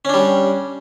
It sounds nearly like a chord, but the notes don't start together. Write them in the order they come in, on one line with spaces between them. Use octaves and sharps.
C#4 D4 G3